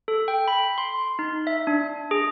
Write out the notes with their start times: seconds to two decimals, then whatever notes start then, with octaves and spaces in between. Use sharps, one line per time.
0.08 A4
0.28 G5
0.48 B5
0.78 C6
1.19 D#4
1.47 E5
1.67 D4
2.11 G#4